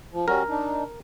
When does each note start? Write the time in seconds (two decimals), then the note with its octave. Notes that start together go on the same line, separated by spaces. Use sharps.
0.12 F3
0.28 G3 C#4 F#4 A#4
0.49 D4 D#4